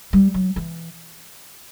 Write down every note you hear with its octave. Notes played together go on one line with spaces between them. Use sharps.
G3
F#3
E3